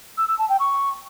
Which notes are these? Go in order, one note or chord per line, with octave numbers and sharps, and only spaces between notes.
E6
E6
A5
G5
C#6